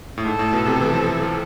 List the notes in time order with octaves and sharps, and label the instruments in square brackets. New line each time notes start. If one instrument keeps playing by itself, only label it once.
[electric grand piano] A2
[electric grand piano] G#2 [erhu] A4
[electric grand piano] A2
B2
C3
E3
F3
F3